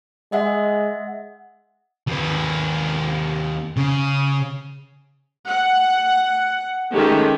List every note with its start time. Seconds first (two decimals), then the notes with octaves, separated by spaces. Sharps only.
0.32 G#3 D#5 E5 F#5
2.07 D#2 B4
3.77 C#3
5.46 F#5
6.91 D#3 G#3 A3 C#4 G4